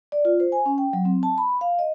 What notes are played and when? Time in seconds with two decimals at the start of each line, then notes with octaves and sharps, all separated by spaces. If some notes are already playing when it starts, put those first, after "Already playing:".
0.12 D5
0.25 F4
0.40 C5
0.52 G#5
0.66 C#4
0.78 G5
0.93 F#3
1.05 C4
1.23 A5
1.38 B5
1.61 F5
1.79 D#5